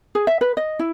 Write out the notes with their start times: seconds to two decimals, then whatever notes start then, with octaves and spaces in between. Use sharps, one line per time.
0.15 G#4
0.27 E5
0.41 B4
0.57 D#5
0.79 E4